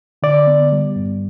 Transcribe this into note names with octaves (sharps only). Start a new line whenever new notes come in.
D3 D5
B3
G3
G2